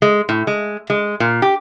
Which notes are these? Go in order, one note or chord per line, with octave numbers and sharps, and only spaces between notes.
G#3
A2
G#3
G#3
A#2
G4